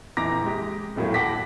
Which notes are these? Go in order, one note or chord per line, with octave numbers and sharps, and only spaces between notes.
A#1 F2 E3 A#5 D6 A#6
G#3 G4
D#1 F2 A2 F#3 A#3
F#5 G5 A5 D6 A#6 B6